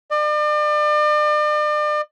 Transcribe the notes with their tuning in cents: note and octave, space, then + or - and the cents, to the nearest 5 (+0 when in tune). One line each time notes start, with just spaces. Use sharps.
D5 +40